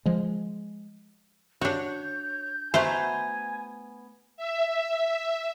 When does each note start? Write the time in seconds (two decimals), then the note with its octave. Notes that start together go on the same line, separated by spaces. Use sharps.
0.06 F3 G#3
1.61 D4 F#4 C#5 G6
2.74 A3 B3 F#4 C5 E5 G#5 A#5
4.37 E5